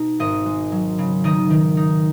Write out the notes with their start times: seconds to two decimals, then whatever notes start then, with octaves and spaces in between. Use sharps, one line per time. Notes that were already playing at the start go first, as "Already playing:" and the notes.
Already playing: B2 D#4
0.19 G#1 D#5
0.46 G#3
0.72 F#3
0.98 C#3
1.24 D#3 D#5
1.50 D#3
1.77 D#4